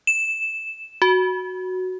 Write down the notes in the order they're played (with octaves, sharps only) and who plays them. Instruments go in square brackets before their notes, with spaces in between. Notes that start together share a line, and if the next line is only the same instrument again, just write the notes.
[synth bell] E7
F#4